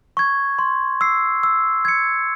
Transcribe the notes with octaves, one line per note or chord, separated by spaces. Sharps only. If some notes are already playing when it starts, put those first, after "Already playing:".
C#6 G#6
C6
E6 C7
E6
G#6 C#7